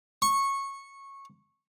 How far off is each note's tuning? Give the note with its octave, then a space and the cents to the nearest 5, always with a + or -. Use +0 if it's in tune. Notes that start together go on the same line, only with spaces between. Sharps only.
C#6 -15